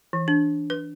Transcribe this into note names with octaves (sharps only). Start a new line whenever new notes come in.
E3
D4
B4